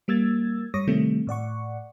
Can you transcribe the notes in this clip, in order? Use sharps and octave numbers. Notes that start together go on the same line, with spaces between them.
G3 A#3 E6 G#6 A6
G2 G3 C#5 C#6 D#6 A#6
C3 D#3 G3 A3 C4
A2 D5 F#5 C#6